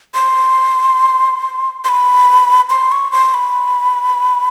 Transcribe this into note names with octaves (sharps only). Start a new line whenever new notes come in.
C6
C6
B5
C6
C#6
C6
B5